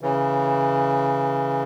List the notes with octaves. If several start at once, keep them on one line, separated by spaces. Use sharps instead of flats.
C#3 E3